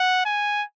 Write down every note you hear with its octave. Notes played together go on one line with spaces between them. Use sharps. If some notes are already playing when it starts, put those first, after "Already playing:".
Already playing: F#5
G#5